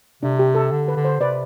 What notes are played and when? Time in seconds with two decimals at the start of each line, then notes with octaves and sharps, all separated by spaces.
0.22 C3 D4
0.39 G4
0.55 A4
0.71 D3
0.88 B4
0.96 D3
1.05 C5
1.21 C3 B4 D5